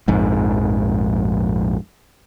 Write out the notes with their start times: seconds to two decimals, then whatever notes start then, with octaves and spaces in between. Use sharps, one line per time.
0.08 A#1 F2 G#2